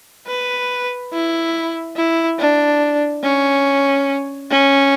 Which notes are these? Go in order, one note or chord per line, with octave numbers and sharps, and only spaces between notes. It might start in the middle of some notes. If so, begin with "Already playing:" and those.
B4
E4
E4
D4
C#4
C#4